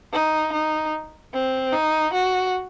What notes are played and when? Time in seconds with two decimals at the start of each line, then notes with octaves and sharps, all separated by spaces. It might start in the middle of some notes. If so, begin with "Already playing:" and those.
0.13 D#4
0.52 D#4
1.33 C4
1.72 D#4
2.13 F#4